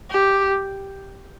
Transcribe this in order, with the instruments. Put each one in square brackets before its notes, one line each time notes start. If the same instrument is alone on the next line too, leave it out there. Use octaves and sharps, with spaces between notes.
[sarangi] G4